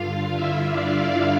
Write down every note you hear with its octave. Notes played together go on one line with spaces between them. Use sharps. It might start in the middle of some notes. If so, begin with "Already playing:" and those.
Already playing: G2 D3 F4 F5
E4 E5
D4 D5
E4 E5